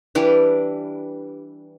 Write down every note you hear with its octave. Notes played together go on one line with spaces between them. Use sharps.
E3 G3 D4 G4